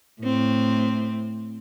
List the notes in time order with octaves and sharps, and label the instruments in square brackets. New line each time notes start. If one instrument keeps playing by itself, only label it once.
[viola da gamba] A2 C4